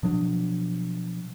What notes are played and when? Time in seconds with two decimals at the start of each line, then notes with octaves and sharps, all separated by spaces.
0.03 B2 F3 F#3 D4